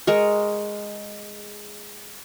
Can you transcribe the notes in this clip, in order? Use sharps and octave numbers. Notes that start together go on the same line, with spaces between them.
G#3 A#4 C#6